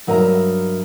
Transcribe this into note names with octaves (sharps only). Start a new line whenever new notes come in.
G2 F#3 A#4 D#5 E5 A#5